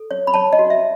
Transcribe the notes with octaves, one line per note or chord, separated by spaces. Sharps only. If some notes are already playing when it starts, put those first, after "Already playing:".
Already playing: A4
C#5
B5
C#5 A5
D#5
F#4
E5